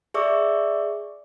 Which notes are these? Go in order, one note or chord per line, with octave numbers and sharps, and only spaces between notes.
G#4 D5 E5 C#6 D6 E6